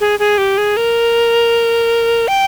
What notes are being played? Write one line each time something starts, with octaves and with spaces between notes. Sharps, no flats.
G#4
G#4
G4
G#4
A#4
G5